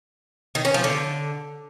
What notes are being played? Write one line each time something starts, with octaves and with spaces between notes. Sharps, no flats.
D#3
C#4
F3
D3